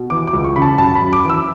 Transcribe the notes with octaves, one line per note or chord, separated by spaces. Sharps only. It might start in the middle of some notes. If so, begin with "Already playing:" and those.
Already playing: B2
E3 D6
D6
C#2
C#6
C#3 B5
A5
F#2 A5
B5
F#2
D6
E3 E6